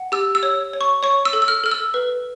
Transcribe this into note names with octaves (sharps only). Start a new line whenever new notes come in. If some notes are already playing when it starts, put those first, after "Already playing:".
Already playing: F#5
G4 E6
E6
C#5
C#5
C#6
C#5 C#6
E6
A4
E6
F6
A4 F6
E6
B4